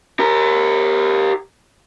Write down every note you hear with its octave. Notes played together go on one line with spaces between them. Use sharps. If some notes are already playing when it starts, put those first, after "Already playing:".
G4 A#4